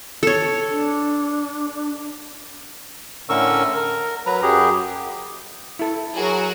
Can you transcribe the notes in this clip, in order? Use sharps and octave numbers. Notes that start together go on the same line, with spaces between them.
A4 C#5
D4
A2 D3 C#4 A#4 C#6 E6
A#4
F#3 B4 A#5
F#2 F#3 G4 G#4
E4 A4
F#3 F#4 G#4 A#4